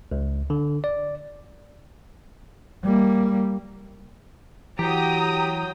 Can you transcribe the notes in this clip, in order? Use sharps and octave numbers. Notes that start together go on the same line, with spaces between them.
C#2
D3
D5
G3 A#3
E3 F#3 G4 G5 A#5 D#6